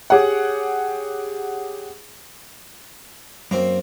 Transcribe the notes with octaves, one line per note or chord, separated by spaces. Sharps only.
G4 G#4 C#5 F#5
F#2 A#3 C4